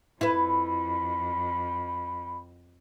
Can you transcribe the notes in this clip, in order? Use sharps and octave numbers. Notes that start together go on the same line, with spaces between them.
F2 E4 B4 B5